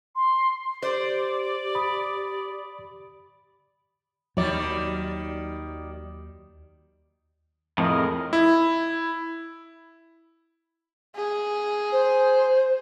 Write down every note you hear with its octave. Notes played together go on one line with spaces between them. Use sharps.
C6
G4 C5 D5
B5 D#6
D#2 D#3 F#3 G3 D5
F2 A2 G#3 A#4 D#5
E4
G#4
C5